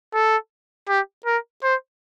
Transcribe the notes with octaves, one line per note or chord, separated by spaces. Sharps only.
A4
G4
A#4
C5